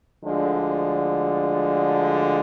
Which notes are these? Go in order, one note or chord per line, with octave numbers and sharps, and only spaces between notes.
D2 D3 F3 G#3